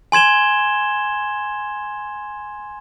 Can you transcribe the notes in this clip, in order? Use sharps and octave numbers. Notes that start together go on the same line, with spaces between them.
G#5 C6 G#6 E7 G7